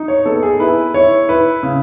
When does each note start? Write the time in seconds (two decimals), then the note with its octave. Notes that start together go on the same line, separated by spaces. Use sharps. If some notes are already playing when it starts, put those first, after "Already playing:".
Already playing: D#4
0.08 C#5
0.25 B3 A4
0.43 G#4
0.60 E4 B4
0.94 E4 C#5
1.29 E4 B4
1.63 C#3